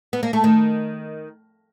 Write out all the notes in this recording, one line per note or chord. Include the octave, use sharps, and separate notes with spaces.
B3
A#3
A3
D#3